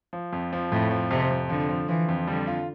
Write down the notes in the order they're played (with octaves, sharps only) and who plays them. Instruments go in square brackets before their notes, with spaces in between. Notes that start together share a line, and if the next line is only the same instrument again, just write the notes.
[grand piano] F3
F2
F3
[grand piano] F2 [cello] A2
[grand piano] F3
[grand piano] F2 [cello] C3
[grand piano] F2
[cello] D3 [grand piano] F3
[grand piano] F3
[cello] E3 [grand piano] F3
[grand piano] F2
[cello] D3 [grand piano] G3
[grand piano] F4